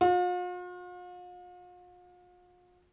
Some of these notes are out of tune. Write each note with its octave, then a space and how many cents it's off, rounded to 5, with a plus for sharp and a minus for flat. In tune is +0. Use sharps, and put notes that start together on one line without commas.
F4 +45